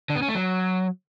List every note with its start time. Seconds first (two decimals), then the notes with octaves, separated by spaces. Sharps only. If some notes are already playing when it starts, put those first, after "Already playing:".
0.10 D3
0.16 B3
0.22 C#4
0.28 A3
0.35 F#3